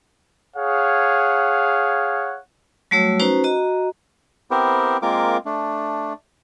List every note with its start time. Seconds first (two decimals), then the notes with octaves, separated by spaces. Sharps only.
0.57 G#4 C#5 F5 F#5
2.91 F#3 G3 A3 F#4 C#5 E6
3.20 C#4 D#4 F#4 B4 C5 A#5
3.44 F#4 D#5 A#5
4.51 B3 C4 E4 G4 A#4 C5
5.02 G#3 A#3 C4 F4 A#4 D6
5.45 A3 D4